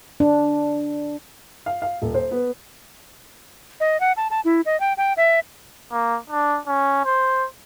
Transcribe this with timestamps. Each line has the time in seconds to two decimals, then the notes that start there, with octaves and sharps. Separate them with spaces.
0.20 D4
1.66 F5
1.82 F5
2.02 D#1
2.14 C5
2.31 B3
3.80 D#5
4.00 F#5
4.17 A5
4.31 A5
4.45 E4
4.66 D#5
4.80 G5
4.97 G5
5.17 E5
5.91 A#3
6.30 D4
6.67 C#4
7.05 C5